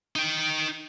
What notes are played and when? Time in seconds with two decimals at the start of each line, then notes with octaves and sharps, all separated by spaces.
0.16 D#4 G5